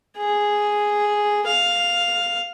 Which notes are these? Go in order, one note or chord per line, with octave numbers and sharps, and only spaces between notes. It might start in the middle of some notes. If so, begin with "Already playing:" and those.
G#4
F5